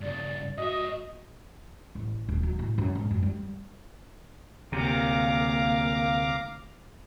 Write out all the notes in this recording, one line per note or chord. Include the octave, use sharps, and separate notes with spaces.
G2 C#3 D5
G#2 F#4 D#5 E5
A1
D#1
F#3
A2
F#2
G#2
F#2
G3
D2 C3 A#3 F5 A#5 D6